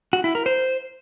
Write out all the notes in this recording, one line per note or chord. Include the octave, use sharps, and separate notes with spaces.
F#4
E4
A#4
C5